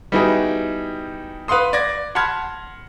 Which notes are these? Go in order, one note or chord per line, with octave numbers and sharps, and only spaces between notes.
G3 B3 D#4 E4 F#4 G#4
B4 F5 F#5 C6 D#6
D5 D6 G#6 A#6
F#5 A5 B5 C6 F6 G#6